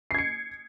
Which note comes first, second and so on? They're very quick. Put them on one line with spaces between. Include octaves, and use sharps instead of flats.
C7 G#6 C#7